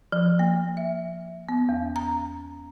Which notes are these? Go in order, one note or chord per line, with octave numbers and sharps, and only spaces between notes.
F3
A#3
E5
B3
E2
A#5